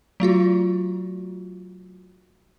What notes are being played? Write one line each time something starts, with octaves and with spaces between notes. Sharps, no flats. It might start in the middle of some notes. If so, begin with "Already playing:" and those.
F#3 A3 F4 F#4